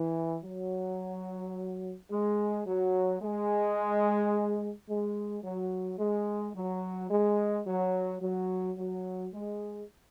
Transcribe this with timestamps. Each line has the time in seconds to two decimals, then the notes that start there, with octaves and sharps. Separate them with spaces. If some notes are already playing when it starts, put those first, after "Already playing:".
Already playing: E3
0.44 F#3
2.11 G#3
2.67 F#3
3.21 G#3
4.89 G#3
5.44 F#3
5.99 G#3
6.55 F#3
7.11 G#3
7.67 F#3
8.22 F#3
8.78 F#3
9.33 G#3